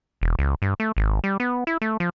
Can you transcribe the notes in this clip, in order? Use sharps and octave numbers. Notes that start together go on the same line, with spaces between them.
E1
C#2
G2
A3
G#1
G3
B3
E4
A3
F3